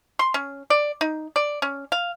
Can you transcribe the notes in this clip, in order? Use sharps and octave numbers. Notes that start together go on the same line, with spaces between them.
C6
C#4
D5
D#4
D5
C#4
F5